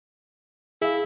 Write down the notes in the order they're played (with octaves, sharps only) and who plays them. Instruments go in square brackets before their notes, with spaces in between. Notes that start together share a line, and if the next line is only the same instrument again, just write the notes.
[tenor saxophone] E4 [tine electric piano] G#4 F5